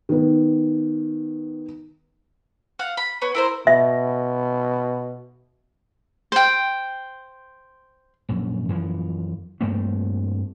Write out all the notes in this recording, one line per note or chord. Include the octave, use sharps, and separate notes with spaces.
D#3 B3
F5 F#5
B5
B3 C#5
E4 A#4 C5
B2 E5
C5 G5
A#1 F#2
F#2 E3 F3
G2 A3 A#3 C4